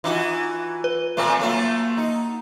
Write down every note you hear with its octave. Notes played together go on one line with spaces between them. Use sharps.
E3 D#4 F4 F#4
B4
A#2 A3 C4
F#3 A3 A#3 F4
D#4